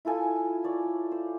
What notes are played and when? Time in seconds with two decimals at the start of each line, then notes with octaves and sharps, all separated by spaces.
0.05 E4 F4 A4 G#5
0.64 C#5 D5
1.12 C5